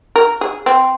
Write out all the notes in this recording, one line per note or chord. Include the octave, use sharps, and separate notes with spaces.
A#4
G#4
C4